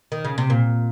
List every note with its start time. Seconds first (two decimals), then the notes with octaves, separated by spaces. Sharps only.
0.12 D#3
0.25 C#3
0.38 C3
0.50 A#2